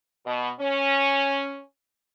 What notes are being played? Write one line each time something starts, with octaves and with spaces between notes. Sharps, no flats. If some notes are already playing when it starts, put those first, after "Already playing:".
B2
C#4